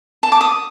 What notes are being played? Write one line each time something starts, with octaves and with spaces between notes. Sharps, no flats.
A5
D6
D#6